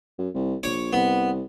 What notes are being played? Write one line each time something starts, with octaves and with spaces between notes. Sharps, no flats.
F#2
C2
A#1 C#5 D6
C2 B3